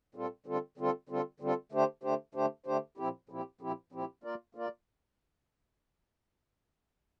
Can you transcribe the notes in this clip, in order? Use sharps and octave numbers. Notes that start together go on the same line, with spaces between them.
A#2 G3 C4 F4 A4
D3 G3 C4 F4 A4
D3 G3 C4 F4 A4
D3 G3 C4 F4 A4
D3 G3 C4 F4 A4
D3 A3 D4 G4 C5
D3 A3 D4 G4 C5
D3 A3 D4 G4 C5
D3 A3 D4 G4 C5
A#2 F3 C4 E4 G4
A#2 F3 C4 E4 G4
A#2 F3 C4 E4 G4
A#2 F3 C4 E4 G4
A#3 F4 A#4 D5
A#3 F4 A#4 D5